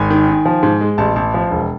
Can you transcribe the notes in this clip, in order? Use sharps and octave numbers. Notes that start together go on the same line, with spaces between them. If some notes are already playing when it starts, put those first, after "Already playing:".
Already playing: G#1 G#5
D#3
D#3
F3
G#2
G#3
A1 A5
A1 A5
F3
E1